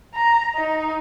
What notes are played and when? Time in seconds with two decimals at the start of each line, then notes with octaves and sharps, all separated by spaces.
0.14 A#5
0.56 D#4